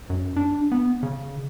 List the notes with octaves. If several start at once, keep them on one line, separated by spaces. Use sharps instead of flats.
F#2
D4
B3
C#3